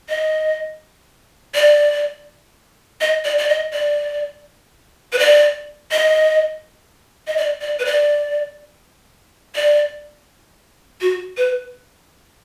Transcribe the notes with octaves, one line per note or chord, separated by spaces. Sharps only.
D#5
D5
D#5
D5
D5
D#5
D5
B4
D5
D#5
D#5
D5
D5
B4
D5
D5
F#4
B4